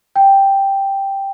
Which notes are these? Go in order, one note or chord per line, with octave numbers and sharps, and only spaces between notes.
G5